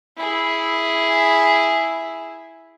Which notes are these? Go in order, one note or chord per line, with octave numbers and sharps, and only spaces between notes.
E4 G#4